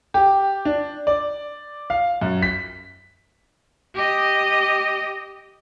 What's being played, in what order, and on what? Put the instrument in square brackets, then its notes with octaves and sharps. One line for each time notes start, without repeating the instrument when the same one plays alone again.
[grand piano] G4
D4
D5
F5
F#2
B6
[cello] G4 D#5